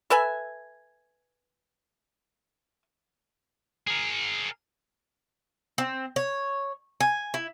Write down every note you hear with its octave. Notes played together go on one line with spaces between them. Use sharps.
A4 B4 E5 G#5
G#4 A#4
C4
C#5
G#5
E4